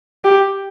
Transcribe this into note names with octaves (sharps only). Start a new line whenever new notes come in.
G4